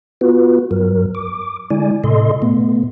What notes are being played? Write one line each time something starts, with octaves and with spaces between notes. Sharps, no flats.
B3 F4 F#4 B4
G2 F#3 A#4
D6
D3 G#3 E4 D5 G#5
A2 C3 A4 D#5 C6
A#2 A3 B3